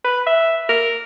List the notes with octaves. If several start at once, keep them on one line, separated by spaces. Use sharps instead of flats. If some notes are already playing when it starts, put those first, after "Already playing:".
B4
E5
A#4